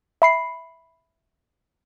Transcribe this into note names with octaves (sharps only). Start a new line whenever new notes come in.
E5 B5 C7 C#7